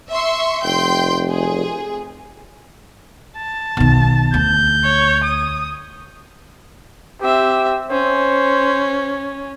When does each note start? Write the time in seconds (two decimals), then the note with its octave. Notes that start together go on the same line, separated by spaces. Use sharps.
0.11 E5 C6 C#6
0.64 F1 G5 C6 G6
1.29 G#4
3.37 A5
3.77 B1 D#3
4.34 D2 G6
4.84 C#5
5.24 D#6
7.22 C4 G4 E5
7.91 C#4 C5